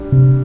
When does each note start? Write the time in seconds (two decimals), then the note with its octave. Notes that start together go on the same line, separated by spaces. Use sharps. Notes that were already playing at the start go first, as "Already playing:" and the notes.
Already playing: G3 D4
0.12 C3